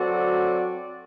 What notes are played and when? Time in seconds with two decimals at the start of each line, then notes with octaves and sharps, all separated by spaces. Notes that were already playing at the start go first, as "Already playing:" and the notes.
Already playing: F#3 C4 F#4 A4 D5